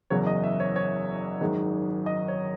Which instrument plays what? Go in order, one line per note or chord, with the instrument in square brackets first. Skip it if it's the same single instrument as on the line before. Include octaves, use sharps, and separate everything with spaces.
[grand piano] F#1 E2 C#3 F#3 C#5
D#5
E5
C#5
C#5
G#1 F#2 D#3 G#3
D#5
C#5